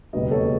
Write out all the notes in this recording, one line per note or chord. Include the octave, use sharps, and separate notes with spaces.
E1 D#2 C#3 F#3 B4 D#5
A4 C#5